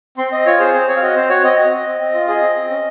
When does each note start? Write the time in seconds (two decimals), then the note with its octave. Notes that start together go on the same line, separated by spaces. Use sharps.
0.18 C4 C6
0.32 C4 D#5
0.46 F4 C#5
0.59 G#4 C5
0.74 C4 C5
0.88 C4 C#5
0.97 F5
1.01 F#4 D#5
1.16 C4 C5
1.29 F#4 C#5
1.44 C4 D#5
1.58 F#4
1.65 D#5
1.72 C4
1.87 C4
2.00 C4
2.14 F4
2.27 G#4 D#5
2.42 C4
2.56 C4
2.70 C#4